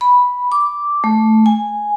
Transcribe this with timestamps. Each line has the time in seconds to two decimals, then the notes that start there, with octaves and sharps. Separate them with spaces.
0.01 B5
0.52 D6
1.04 A3
1.46 G#5